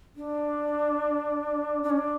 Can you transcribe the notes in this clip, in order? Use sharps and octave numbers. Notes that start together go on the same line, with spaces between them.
D4
D4
C#4
D4